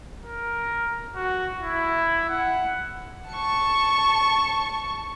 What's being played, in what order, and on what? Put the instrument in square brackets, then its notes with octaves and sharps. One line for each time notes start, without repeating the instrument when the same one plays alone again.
[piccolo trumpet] A#4
F#4
E4
F#5
[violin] A5 C#6